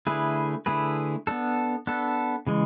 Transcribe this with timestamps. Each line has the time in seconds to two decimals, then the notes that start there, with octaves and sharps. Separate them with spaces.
0.07 D3 A3 E4 G#4 B4
0.66 D3 A3 E4 G#4 B4
1.27 B3 D4 A4
1.87 B3 D4 A4
2.47 C#3 E3 G#3